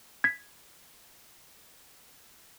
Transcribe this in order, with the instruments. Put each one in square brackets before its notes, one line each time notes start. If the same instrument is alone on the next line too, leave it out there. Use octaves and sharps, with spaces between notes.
[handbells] G#6 B6